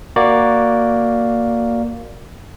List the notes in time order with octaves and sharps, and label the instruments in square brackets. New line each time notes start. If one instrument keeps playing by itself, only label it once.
[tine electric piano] A#3 F#4 D5